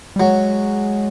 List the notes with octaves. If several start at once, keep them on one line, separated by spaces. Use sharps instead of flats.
G3
F#3 G#3